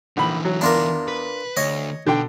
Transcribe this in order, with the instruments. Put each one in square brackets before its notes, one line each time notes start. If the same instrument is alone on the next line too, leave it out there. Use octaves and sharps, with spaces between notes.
[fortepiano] A#1 B5 [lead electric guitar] D3 E3
[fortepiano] F#3
[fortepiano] E2 [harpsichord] D4 F4 A#4
[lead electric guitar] B4
[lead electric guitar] D2 [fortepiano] C#5 [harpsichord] D#5
[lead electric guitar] B2 [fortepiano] D3 G5